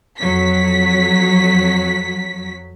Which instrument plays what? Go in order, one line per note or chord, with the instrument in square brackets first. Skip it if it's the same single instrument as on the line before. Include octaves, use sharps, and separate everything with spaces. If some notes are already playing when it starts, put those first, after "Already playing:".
[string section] F2 F#3 B6